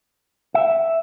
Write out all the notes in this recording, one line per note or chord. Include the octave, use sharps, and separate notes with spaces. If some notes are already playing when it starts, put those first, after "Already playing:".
E5